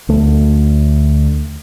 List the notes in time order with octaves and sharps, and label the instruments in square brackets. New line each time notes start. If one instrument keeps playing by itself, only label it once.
[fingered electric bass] D2 A3